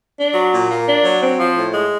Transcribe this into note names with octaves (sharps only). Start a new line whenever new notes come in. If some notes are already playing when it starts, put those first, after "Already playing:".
D4
F#3
A#2
A#3
D4
F#3
C4
F3
A2
G#3